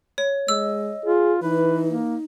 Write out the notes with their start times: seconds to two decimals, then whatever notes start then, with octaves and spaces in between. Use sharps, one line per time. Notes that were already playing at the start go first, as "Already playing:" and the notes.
0.18 C#5
0.48 G#3 D#5 E6
1.05 F4 G#4
1.43 E3 D#4 B4
1.87 A#3